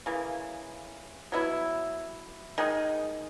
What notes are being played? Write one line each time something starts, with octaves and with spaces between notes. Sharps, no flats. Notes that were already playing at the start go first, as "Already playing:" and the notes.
C#3 E3 A#3
F#3 B3 E4
D#3 G#3 D#4 G#4